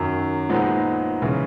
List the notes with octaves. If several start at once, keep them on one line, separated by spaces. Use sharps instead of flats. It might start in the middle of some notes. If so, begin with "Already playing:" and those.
Already playing: F#2 D#3 F#3
A#2 F3 G#3 B3 D#4
C#3 E3 G#3